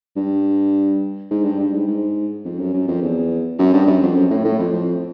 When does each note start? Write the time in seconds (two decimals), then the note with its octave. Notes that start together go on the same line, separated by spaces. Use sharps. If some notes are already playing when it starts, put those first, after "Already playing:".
0.16 G2
1.31 G#2
1.44 G2
1.60 G2
1.73 G#2
1.87 G#2
2.45 F2
2.59 F#2
2.73 F#2
2.88 F2
3.02 E2
3.59 F#2
3.74 G2
3.87 F#2
4.02 F2
4.16 F#2
4.30 A2
4.45 A2
4.59 F2
4.73 F2